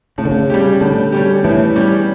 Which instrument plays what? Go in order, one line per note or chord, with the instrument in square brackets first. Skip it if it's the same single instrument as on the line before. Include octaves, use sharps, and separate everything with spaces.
[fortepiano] A2 [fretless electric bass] C#3
[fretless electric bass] D3
C#3
[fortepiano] G3 C#4 G4
[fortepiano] A2 [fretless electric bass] D3
[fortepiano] G3 C#4 G4
[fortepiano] A2 [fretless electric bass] E3
[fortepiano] G3 C#4 G4